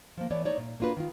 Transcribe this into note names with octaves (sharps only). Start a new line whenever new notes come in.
F3 A#3
E3 A3 B3 C#5 D5
A3 D#4 C#5 D5
A#2
A#3 D4 F4 F#4 B4
D#3 F4